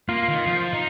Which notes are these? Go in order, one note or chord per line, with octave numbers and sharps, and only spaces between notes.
A#3 F4
D#3
F3
D#4